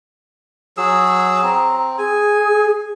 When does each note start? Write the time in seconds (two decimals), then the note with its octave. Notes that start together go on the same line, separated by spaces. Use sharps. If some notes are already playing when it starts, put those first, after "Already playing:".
0.77 F#3 G#4 E6
1.43 C4 A#5
1.98 G#4 G#5